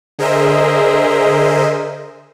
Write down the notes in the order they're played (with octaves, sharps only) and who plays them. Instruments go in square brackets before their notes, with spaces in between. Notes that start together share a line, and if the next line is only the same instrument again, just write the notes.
[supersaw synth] D3 G#4 A#4 C5 D#5 E5